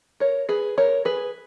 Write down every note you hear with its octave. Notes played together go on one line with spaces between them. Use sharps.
A#4 C#5
G#4 B4
A#4 C#5
G#4 B4